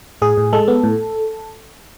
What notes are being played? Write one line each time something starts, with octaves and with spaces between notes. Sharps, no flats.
A2 G#4
A2
G#3 A4
B3
A2